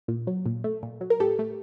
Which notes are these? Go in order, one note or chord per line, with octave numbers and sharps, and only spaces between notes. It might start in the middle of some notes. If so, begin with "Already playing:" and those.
A#2
F#3
A#2
A3
A#2
F#3
A#4
A2 G4 A4
A3